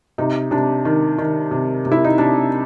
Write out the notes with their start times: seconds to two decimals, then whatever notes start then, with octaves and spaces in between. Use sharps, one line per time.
0.18 C3 D#4
0.51 C3 D4
0.85 D#3
1.18 D#3
1.51 C3
1.85 C3
1.92 E4
2.04 D#4
2.18 C3 D4